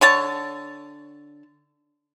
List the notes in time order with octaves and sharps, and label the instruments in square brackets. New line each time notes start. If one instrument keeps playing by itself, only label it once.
[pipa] D3 C#5 A5